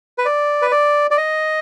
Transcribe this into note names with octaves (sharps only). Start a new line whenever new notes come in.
B4
D5
B4
D5
D5
D#5